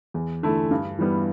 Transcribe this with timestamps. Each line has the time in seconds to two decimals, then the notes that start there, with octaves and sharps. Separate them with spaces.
0.14 E2
0.43 D3 A3 E4
0.71 G2
0.99 E3 G3 B3